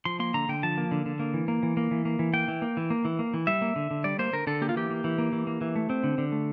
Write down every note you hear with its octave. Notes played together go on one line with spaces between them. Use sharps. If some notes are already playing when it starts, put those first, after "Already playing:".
F3 C6
A#3 C6
D3 A#5
D3 G5
F3 A5
A#3
D3
D3
A#3
E3
A#3
E3
A#3
E3
A#3
E3
A#3 G5
E3
A#3
E3
A#3
E3
A#3
E3
G3 E5
A#3
D3
D3
G3 D5
A#3 C5
D3 A#4
D3 A4
A#3 G4
F4
E3 G4
A#3
E3
A#3
E3
A#3
E3
A3
C4
D3
D3
A3